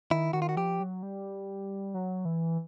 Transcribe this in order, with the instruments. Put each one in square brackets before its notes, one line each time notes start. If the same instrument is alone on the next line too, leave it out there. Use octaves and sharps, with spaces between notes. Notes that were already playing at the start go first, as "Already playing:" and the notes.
[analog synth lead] D#3 [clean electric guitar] E4
[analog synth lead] D#3 [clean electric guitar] F#4
[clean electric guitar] F4
F#4
[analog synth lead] F3 [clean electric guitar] G4
[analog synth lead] F#3
G3
F#3
E3